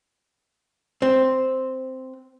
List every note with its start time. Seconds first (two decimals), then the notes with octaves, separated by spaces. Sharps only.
1.02 C4